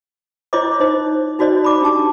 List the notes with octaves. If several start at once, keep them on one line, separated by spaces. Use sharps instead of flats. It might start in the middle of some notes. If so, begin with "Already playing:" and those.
E4 F4 C5 C#5 D#5 D6
D#4 C5 D#5
D#4 F#4 C5 D5 D#5
B5 D6
D4 G4 A5